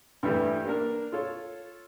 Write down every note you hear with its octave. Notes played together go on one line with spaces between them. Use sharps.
G2 E3 G3 A3
A#3 D4 A#4
F4 A4 C#5